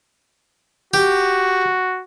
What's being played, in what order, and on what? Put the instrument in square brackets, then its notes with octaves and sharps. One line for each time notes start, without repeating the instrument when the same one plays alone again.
[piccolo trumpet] F#4 [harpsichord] G4